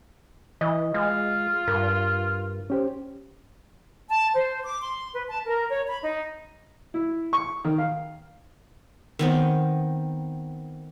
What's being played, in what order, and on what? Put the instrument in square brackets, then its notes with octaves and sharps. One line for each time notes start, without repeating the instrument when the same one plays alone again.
[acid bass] E3 [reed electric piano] D#5
[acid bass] G#3 [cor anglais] F4
[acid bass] G2 [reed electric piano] A#4
[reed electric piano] C#4 G4 C5
[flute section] A5
C5
D6
C6
B4
A5
A#4
C#5
B5
D#4
[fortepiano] E4
C#6
D#3
F5
[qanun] D#3 B3 C4